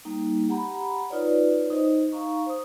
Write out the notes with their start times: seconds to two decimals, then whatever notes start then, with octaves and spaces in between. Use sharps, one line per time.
0.05 G3 A#3 D#4
0.48 G4 F#5 A#5 B5
1.10 D#4 F4 B4 C#5 D5
1.70 D#4 C5 D#5
2.12 D#4 F5 A#5 C#6
2.46 C5 D#6